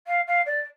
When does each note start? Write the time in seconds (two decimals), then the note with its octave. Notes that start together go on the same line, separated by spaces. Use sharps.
0.07 F5
0.28 F5
0.46 D5